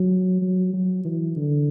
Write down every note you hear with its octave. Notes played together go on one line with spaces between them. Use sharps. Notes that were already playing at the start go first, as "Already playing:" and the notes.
Already playing: F#3
F#3
F#3
E3
D3